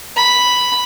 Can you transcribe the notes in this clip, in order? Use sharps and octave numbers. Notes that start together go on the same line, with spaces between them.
B5